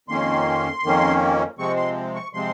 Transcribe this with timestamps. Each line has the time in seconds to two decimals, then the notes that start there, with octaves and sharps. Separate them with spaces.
0.08 F2 D#3 A#3 C#4 C6
0.83 F2 D#3 A#3 C#4
1.58 C3 F3 G#3 C4 C#6
1.77 C6
2.15 C#6
2.33 C3 F3 G#3 C4 C6